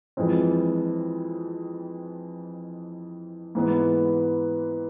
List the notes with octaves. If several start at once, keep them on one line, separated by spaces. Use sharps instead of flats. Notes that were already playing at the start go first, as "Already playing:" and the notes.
F2 E3 G#3 C4
G#2 E3 B3